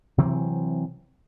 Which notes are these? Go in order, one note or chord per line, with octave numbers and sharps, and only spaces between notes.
C3 E3 F#3 C4